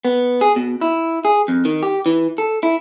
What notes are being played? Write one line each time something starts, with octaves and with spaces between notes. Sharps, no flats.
B3
G#4
B2
E4
G#4
F2
D#3
G4
E3
A4
E4